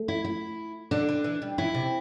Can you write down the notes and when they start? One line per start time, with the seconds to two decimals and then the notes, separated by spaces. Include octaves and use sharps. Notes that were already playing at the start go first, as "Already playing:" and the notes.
Already playing: A3
0.08 E4
0.24 E4
0.91 D3 D4
1.09 D3
1.24 E3
1.42 G3
1.58 E3 E4
1.74 C3